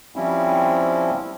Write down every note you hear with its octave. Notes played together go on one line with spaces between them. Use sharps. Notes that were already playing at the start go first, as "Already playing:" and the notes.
F3 G3 C4 C#4 E4